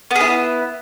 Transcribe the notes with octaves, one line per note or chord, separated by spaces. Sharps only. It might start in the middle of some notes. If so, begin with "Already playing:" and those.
B3 E4 G#4